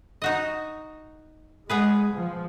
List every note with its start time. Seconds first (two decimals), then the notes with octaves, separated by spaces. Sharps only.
0.22 D#4 F#4 D#5
1.70 G#3 B3 G#4 B4
2.15 F3